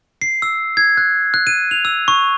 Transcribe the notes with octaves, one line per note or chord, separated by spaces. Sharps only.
C7
E6
G#6
F#6
F#6
D#7
F7
E6
C#6